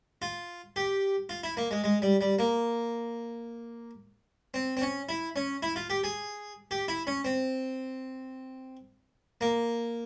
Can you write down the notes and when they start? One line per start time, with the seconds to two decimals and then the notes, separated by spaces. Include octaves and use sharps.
0.22 F4
0.76 G4
1.29 F4
1.43 E4
1.57 A#3
1.71 G#3
1.84 G#3
2.02 G3
2.21 G3
2.39 A#3
4.54 C4
4.77 C4
4.82 C#4
5.09 E4
5.36 C#4
5.63 E4
5.76 F4
5.90 G4
6.04 G#4
6.71 G4
6.88 E4
7.07 C#4
7.25 C4
9.41 A#3